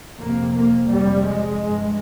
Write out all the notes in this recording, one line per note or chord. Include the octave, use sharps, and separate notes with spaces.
F2 C3 A#3
A#3
F2 C3 G3
G#3
G2